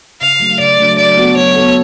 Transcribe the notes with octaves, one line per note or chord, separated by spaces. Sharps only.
C#3 F5
F#3 A3 D4
C#3 D5
F#3 A3 D4
F#3 D5
B3 F#4 A4
F#3 C#5
B3 F#4 A4